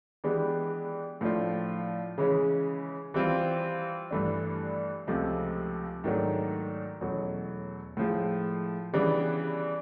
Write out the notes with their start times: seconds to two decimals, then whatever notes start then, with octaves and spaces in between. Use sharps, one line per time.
0.24 E3 G#3 B3 D4 G4
1.21 A2 F3 A3 D4 F4
2.18 C#3 E3 G#3 C#4
3.14 E3 G3 C4 F4
4.11 G2 E3 A3 D4
5.07 C#2 C3 F3 A3
6.04 G#2 D#3 F#3 A3 D4
7.01 E2 B2 F#3 A3 C#4
7.97 A2 F3 G#3
8.94 C#3 E3 G3 B3 D4